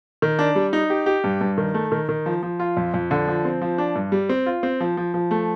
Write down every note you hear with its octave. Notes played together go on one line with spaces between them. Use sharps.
D#3
D4
G3
D#4
G4
G4
G2
G2
D#3
A3
D#3
D#3
F3
F3
F4
F2
F2
D3
F3
C4
F3
D4
G2
G3
C4
F4
C4
F3
F3
F3
A3